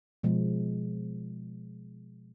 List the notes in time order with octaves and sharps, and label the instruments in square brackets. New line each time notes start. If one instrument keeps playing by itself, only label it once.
[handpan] B2 F3 G#3